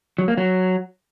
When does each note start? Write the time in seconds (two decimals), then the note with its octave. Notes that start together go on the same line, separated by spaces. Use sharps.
0.19 F#3
0.28 A#3
0.38 F#3